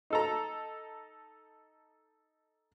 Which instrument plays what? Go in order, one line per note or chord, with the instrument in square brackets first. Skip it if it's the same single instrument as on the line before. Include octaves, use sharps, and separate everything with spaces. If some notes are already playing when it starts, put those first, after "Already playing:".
[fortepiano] D#4 A4 A#5